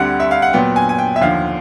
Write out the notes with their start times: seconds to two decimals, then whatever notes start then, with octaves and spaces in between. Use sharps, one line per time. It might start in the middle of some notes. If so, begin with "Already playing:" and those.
Already playing: D2 D3 G3 C4 F#5
0.20 E5
0.31 F5
0.42 F#5
0.53 A#2 F#3 B3 G5
0.76 G#5
0.89 G#5
0.99 G5
1.16 E5
1.21 D#2 D3 F3 F5